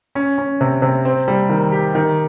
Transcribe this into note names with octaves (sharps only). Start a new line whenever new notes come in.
C#4
C#4
C3
C3
C4
G3
D#3
G4
D#3